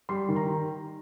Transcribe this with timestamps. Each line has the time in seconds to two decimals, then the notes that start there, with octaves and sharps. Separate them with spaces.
0.09 G3 C6
0.29 D#3
0.36 A#5